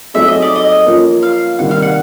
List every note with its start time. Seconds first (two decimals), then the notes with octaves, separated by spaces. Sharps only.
0.14 F#3 A3 C4 D#4 G#4 E5
0.28 D#5
0.42 D5
0.56 D#5
0.86 F3 A#3 C#4
1.23 F5
1.58 C3 D#3 G3 A#3 F#5
1.71 F5
1.82 F#5